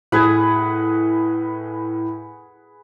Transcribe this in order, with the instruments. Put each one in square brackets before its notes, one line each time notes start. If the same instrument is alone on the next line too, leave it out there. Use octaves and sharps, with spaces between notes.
[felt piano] A2 G#6 [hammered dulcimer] G#4 B4 F#5